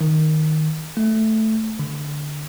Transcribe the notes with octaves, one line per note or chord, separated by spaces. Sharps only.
D#3
A3
D3